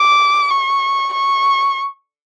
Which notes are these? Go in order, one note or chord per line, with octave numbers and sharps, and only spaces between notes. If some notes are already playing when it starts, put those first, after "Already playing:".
Already playing: D6
C#6
C#6